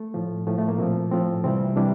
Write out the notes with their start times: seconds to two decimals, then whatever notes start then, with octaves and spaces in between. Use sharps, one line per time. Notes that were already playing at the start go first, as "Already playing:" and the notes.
Already playing: A3
0.14 A2 F3
0.47 A2 F3 A3
0.58 A3
0.68 A#3
0.78 A#2 F3 C4
1.11 A2 F3 C4
1.44 C3 E3 G3 C4
1.76 C3 E3 G3 D4